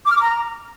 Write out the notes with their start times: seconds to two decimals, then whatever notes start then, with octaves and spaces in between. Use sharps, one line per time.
0.06 D6
0.11 F6
0.16 D6
0.21 A#5